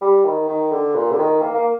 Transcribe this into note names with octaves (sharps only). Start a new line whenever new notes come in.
G3
D#3
D#3
D3
A#2
D3
D#3
A#3
A#3